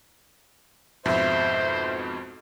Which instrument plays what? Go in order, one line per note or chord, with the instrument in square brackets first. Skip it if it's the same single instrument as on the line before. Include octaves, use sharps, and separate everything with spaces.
[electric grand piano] F2 G#2 B2 [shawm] C5 [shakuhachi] E5